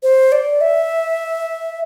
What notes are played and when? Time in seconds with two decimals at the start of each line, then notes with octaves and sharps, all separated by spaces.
0.03 C5
0.32 D5
0.61 E5